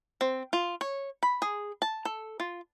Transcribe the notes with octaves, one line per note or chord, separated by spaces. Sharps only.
C4
F4
C#5
B5
G#4
A5
A4
F4